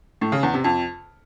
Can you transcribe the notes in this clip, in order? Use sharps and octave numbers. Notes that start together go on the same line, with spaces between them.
A2
C#3
E2
C3
F2